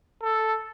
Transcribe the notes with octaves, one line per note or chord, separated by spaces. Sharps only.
A4